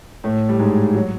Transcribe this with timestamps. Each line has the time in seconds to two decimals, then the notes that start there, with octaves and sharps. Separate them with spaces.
0.24 A2 A3
0.49 G3
0.59 G#2 G#3
0.95 F#3